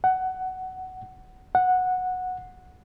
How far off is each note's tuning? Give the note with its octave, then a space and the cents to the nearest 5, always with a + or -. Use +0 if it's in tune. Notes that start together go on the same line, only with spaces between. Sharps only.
F#5 +15
F#5 -10